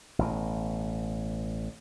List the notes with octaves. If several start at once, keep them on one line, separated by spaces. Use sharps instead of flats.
A1 B2